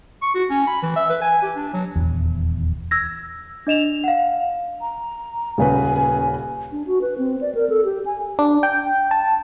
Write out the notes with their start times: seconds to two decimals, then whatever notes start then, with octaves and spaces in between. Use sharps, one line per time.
0.22 C#6
0.35 F#4
0.50 C#4
0.67 B5
0.82 E3
0.96 E5
1.10 B4
1.22 G#5
1.42 G4
1.56 D4
1.73 F#3
1.96 D#1 G#1 E2
2.91 E6 G#6 A#6
3.67 D4 D#5 E7 F7
4.04 F5 F#5
4.81 A#5
5.58 D#1 C#3 B4 G#5
6.72 D4
6.87 F#4
7.01 B4
7.18 C4
7.41 D5
7.55 A#4
7.70 A4
7.84 G4
8.06 G#5
8.39 D4
8.63 G5
9.11 A5